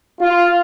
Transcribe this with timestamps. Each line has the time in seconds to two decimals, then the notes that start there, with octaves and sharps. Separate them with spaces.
0.21 F4